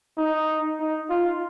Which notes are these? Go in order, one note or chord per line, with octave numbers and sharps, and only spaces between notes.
D#4
D#4
F4